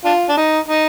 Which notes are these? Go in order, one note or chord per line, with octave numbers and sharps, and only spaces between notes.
D4 F4
D4
D#4
D#4